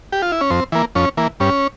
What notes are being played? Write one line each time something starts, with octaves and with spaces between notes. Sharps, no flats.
G4
F4
E4
C#4
F2 C4
E3 A#3
F2 C#4
E3 A#3
G2 C#4